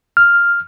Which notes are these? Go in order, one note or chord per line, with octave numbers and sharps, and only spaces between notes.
F6